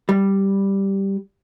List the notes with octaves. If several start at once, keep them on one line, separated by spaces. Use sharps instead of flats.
G3